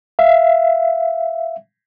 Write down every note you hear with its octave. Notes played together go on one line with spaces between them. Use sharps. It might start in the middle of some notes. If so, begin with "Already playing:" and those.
E5 F5